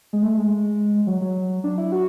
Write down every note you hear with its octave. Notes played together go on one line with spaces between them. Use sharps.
G#3
A3
G#3
F#3
F#3
D4
E4
F#4